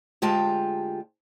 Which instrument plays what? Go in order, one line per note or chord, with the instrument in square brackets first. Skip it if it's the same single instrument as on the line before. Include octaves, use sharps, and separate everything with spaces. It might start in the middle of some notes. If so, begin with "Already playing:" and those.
[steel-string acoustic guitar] D2 G#3 F4 G4 G5 A5